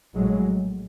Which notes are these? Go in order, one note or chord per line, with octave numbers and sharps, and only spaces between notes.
A#1 A2 F#3 G#3